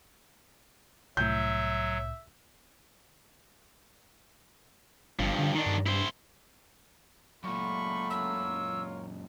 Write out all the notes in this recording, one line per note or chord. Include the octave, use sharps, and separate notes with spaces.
C2 A2 F#3 E5 G6
G1 G2 F3
D3
D#3 D4 D#4
G2
E4 C5
F#2 A#2 F#3 A3 F4 D5 B5 C#6
F4 A#4 C#5 E6